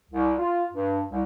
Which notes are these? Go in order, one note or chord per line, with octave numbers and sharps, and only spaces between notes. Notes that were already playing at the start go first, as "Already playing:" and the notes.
C2
F4
G2
C2